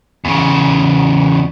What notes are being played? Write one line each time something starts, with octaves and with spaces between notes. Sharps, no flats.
E2 C#3